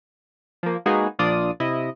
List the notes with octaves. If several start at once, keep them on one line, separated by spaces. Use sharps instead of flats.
F3 A#3
G#3 A#3 B3 D#4 F#4 G#4
A#1 A#2 D4 F4 D5 D#6
C3 E4 D#5